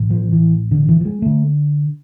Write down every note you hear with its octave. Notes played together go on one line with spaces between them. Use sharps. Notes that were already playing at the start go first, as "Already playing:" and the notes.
Already playing: A1 A2
F3
E3
D3
E3
F3
G#3
D3 A3